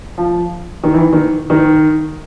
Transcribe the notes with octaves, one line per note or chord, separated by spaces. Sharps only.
F3
D#3
E3
D#3
D#3